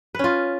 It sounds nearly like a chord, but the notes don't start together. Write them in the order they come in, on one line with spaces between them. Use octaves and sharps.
B4 C#4 F4